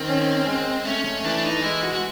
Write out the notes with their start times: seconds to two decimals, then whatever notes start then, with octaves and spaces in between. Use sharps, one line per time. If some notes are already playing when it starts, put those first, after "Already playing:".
Already playing: D#3 C4
0.08 C#4
0.46 G#3
0.85 A3 C#4
1.04 C#4
1.24 E3 D4
1.44 D#4
1.62 G#3 E4
1.82 F#4
1.93 F#4